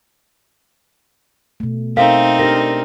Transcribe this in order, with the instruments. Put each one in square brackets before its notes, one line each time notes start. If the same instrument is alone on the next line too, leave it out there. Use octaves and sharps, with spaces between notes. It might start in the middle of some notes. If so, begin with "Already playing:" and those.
[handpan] B2 A3
[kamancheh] C4 D#4 [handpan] A4 A#4 E5 [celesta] F5
[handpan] D4 G4 A#4 [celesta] A#6